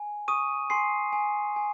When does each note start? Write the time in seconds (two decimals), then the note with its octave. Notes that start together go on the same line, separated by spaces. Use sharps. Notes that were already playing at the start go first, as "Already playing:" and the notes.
Already playing: G#5
0.28 C#6 D#6 D#7
0.70 G#5 C6 C7
1.13 G#5
1.56 G#5